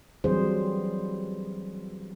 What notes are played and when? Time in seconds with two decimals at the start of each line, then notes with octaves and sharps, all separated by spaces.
0.24 E3 F#3 G3 C4 G#4 C5